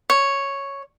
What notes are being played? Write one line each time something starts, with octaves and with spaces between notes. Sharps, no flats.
C#5